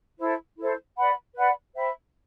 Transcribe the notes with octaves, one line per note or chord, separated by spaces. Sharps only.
E4 A4 C5
E4 A4 C5
B4 D5 F#5 B5
B4 D5 F#5 B5
C5 E5 G5 B5